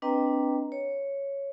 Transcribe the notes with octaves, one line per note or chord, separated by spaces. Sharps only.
C4 D4 B4 D#5 G5 A#5
C#5